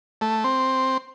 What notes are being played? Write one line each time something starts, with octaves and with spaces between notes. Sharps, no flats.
A3
C4